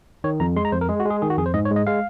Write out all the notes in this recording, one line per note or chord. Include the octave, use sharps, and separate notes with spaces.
D#3 C#5
F2 A#5
G#3 C6
A#5
F2 C5
A#4
G#3 G#4
F#4
G#3
G#4
D#3 G#4
F#4
F2 G#4
C5
G#2 D#5
C#5
G#3
D#5
G#3 F5